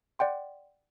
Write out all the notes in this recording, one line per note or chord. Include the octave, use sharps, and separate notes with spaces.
D5 F#5 G5 C6